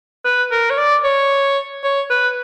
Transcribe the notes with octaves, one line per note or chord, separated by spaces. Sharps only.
B4
A#4
C#5
D5
C#5
C#5
B4